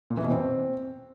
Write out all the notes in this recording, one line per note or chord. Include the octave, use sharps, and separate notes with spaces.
A#2
E3
B2
C4